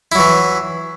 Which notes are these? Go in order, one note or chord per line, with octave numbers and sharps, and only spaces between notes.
E3 F#3 E4